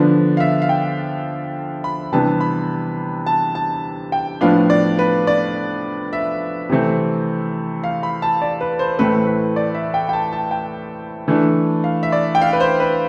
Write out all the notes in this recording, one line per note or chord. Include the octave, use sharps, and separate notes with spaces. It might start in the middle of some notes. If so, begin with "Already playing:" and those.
Already playing: D3 F3 B3 D4
F5
E5
F5
G5
B5
C3 E3 G3 B3 D4 A5
B5
A5
A5
G5
A2 F3 B3 D4 F5
D5
B4
D5
E5
C3 E3 A3 C4
F5
B5
A5
D5
B4
C5
A2 E3 A3 C4 B4
B4
D5
E5
G5
G5
A5
A5
G5
E3 A3 D4
F5
E5
D5
G5
F5
B4
C5
B4